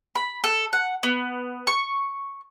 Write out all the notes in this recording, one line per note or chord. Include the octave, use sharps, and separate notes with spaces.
B5
A4
F#5
B3
C#6